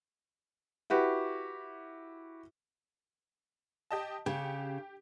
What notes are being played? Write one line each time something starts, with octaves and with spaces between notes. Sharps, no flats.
E4 F#4 G4 B4
G4 D#5 A5
C#3 G4